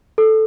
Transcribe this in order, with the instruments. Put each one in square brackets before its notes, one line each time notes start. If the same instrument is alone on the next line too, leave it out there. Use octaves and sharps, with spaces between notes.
[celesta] A4